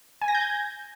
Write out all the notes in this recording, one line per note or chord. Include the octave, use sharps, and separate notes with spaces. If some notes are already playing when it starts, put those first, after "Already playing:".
G#5
A#6
G6
G#6